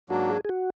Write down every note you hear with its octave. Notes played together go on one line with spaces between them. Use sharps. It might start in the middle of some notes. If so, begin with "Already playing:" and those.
G#2 F#3 A#3 D4 F#4
G#4
G#4
F#4